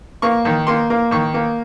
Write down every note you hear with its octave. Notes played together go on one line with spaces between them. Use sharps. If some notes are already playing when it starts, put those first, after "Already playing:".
A#3 C#6
D#3
A#3 C6
A#3
D#3 C#6
A#3